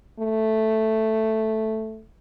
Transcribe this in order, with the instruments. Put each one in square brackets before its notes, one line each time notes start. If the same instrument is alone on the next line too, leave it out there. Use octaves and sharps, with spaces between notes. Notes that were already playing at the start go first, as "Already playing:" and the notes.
[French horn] A3